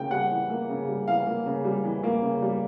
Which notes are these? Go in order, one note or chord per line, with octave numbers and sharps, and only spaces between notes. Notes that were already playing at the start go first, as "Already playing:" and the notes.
Already playing: C#3 E3 A#3 G5
G3 F#5
E3
A#3
C#3
G3
E3 F5
A#3
C#3
G3
E3
A#3
C#3
G3